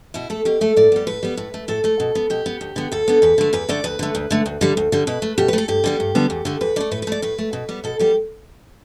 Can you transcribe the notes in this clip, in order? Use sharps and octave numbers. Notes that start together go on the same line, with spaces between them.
B2 E4
A3 A4
B2 G4
A3 A4
A2 D5
G3 B3
A2 B4
G3 B3
A2
A3
A2 A4
A3 A4
B2
B3
B2 G4
B3
D2
D3 B3
D2 A4
D3 B3
E2 B4
D3 A3
E2 B4
D3 A3 D5
D2 B4
D3 A3
D2
D3 A3
D2
D3 G3
D2
D3 G3
B2 B4
A3
B2 G4
B4
A3 A4
G2 G4
D3 G3 B3
G2
D3 G3 B3
E2
D3 A3
E2 B4
D3 A3 D5
A2 B4
B4
A3 D5
A2 B4
A3
B2
G3 B3
B2 A4
G3 B3 G4